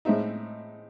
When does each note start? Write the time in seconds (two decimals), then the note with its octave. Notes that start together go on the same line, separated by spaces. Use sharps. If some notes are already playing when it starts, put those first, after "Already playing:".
0.05 A2 G#3 C4 D#4 E5